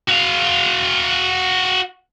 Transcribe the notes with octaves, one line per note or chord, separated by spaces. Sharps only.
F#4 F5